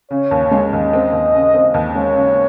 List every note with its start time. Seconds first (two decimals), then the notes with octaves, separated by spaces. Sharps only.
0.11 C#3 C#5
0.31 D#2
0.51 G#3
0.73 D#2 D#5
0.93 C4
1.13 D#2
1.33 C#3
1.54 C4
1.74 D#2
1.95 G#3 C#5
2.16 C#3